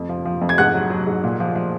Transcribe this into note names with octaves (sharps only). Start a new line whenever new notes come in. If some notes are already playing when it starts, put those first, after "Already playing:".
Already playing: F2
F3
F3
F2
G#6
G#2 F#5 F#6
F#3
F#3
G#2
A#2
F3
F3